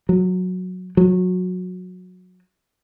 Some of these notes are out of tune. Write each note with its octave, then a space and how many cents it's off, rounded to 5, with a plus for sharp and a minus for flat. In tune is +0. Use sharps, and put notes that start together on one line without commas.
F#3 -15
F#3 -20